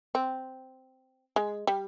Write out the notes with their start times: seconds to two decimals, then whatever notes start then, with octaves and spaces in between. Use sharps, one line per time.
0.15 C4
1.36 G#3
1.67 G3